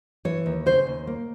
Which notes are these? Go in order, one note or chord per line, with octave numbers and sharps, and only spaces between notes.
E3 C#5
D#2
C#3 C5
D#2
A#3